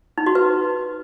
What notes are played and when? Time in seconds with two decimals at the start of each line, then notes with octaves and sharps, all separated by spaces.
0.18 D#4
0.26 F#4
0.35 B4